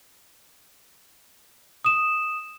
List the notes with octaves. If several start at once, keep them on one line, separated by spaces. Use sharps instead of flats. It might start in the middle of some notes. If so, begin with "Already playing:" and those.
D#6 E7